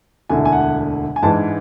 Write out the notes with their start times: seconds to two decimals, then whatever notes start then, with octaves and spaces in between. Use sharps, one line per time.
0.29 E1 D2 D3 A3 E4 G#5
0.45 G#5
0.52 F#5
1.16 G#5
1.23 G#2 E3 G#3 D4 A5